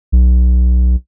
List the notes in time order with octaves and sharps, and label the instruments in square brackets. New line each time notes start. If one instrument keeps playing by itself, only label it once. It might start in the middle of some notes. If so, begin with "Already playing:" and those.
[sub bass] B1